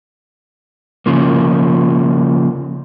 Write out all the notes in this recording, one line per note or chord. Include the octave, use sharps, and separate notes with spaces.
C#3 F3 A#3